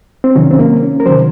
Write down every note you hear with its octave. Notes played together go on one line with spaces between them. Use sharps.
C4
C3 D#3 F#3 C#4
C4
A#3
C#4
A#4
C3 D#3 F#3 C5